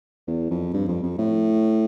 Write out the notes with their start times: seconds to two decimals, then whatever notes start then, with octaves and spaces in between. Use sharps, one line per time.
0.27 E2
0.50 F2
0.74 G2
0.88 F2
1.03 F2
1.18 A2